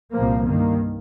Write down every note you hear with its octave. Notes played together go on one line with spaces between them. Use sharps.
C2 A#2 F3 A#3
G2 D#3 A#3